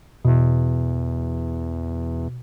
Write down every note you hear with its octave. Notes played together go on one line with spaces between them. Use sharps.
E2 B2